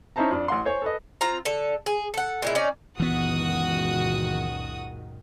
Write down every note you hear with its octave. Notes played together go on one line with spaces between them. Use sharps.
C#4 D#4 E4 C5 A5 A#5
F2 D4
A1 F#5 C6
C5 C#5 G#5
A4 B4 D#5
C4 F4 A#5
D3 A4
G#4
A4 F#5
A#2 G#3 E4
C#4 D#4 D5
C#2 F#2 A#2 D#3 E3 B3 F#4 D#6